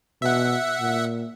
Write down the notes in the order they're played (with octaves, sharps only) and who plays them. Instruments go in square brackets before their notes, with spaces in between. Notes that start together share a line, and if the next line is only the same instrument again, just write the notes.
[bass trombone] B2 [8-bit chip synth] E5 F#5
[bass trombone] A#2